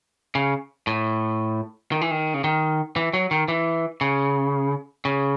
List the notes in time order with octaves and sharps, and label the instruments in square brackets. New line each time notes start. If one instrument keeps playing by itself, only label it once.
[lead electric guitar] C#3
A2
D#3
E3
D#3
C#3
D#3
E3
F#3
D#3
E3
C#3
C#3